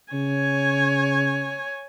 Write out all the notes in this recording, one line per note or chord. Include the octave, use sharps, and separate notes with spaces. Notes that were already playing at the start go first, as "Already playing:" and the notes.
C#3 C#5 G#5